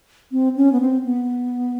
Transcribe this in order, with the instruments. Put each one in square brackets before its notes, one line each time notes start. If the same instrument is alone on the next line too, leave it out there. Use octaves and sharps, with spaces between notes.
[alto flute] C4
C#4
B3
C4
B3